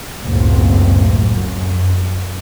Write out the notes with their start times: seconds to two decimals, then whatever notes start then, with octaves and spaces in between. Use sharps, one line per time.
0.22 F#1 C#2 A2 F#3 A#3 C4
1.32 F#2